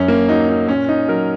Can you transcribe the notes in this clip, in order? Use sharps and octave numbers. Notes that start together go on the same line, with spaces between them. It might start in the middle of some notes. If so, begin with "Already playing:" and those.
Already playing: F#2 C#4
A#3
F#3 D#4
D#4
A#2 C#4
D#4
F#3 A#4